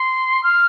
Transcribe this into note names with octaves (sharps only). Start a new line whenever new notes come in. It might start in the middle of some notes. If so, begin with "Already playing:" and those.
Already playing: C6
F6